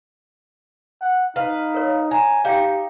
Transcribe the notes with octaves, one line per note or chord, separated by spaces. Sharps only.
F#5
D#4 B4 F5
A#4 C#5
G#5 A#5
D#4 G4 F5 G5